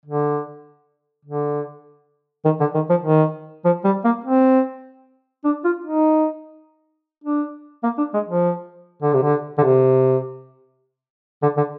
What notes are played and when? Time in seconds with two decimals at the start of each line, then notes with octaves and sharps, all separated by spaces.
0.05 D3
1.25 D3
2.45 D#3
2.60 D3
2.74 D#3
2.89 F3
3.05 D#3
3.65 F3
3.84 G3
4.04 A#3
4.24 C4
5.44 D4
5.64 F4
5.84 D#4
7.24 D4
7.83 A#3
7.98 D4
8.14 G#3
8.28 F3
9.02 D3
9.13 C3
9.22 D3
9.58 D3
9.63 C3
11.42 D3
11.57 D3